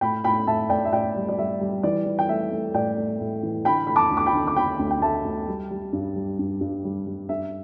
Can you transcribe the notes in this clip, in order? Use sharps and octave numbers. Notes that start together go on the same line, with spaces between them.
A2 G5 B5
A2 G5 B5
A2 E5 A5
A2 D5 G5
E5
A2 D5 G5
G3
D5
G3 E5
G3
E3 D5
E3
G5
A3 E5
A3
A2 D5 G5
A3
A2
E3
D3 G5 B5
A3 B5
A5 D6
D2
D6
G5 B5
D3
D6
D3 G5 B5
D2
G5
A3 E5 A5
D2
G3
G3
G2
G3
G2
G2
G3
G3
G2 E5